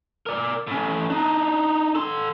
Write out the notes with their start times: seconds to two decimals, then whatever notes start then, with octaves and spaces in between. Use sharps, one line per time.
0.26 A#4 D5
0.67 A2 C#4
1.10 D4 D#4
1.95 A4 C6